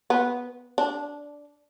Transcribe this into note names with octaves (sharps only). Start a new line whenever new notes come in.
B3
D4